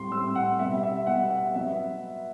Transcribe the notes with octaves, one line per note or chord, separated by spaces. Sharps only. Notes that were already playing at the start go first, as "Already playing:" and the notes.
Already playing: A2 G3 C4 C6
A2 G3 C4 E6
F#5
B2 G3 B3 E5
E5
B2 G3 B3 F#5
F#5
F#3 B3 E5